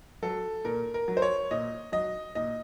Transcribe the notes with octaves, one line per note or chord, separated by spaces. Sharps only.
F#3 A4
A#2 A#4
A#4
F#3
C5
C#5
A#2 D#5
F#3 D#5
A#2 D#5